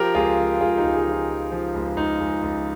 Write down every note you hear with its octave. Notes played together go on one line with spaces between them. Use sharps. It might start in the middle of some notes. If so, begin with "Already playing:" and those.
Already playing: F3 G4 A#4
C#2 F4 G#4
F3
C#2 F4 G#4
D#4 G4
C#2
F4 G#4
F3
F4
F3
F3
C#2
C#2 D#4
C#2
C#2